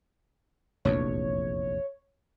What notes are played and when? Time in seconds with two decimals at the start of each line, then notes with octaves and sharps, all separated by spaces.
0.85 F1 A#1 E2 C#5